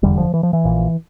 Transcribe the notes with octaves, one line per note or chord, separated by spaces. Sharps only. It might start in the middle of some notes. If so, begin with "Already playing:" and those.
F1 E2 D3 G3
F3
E3
F3
E3
A#1 A#2